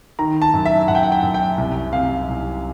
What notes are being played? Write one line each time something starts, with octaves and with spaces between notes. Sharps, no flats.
D#3 A#5
A5
F#2
E5
F#2 F#5
G5
F#5
G5
F#2
G5
C2
C3 F5
C2